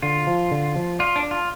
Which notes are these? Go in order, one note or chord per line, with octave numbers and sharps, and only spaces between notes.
D3 F4
F3
D3
F3
F4 D5
D4
D5
F4